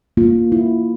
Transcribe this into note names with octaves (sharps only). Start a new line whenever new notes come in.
A#3 F4
E4